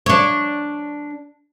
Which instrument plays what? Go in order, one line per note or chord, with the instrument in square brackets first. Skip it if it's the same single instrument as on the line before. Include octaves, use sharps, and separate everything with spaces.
[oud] D4 C#5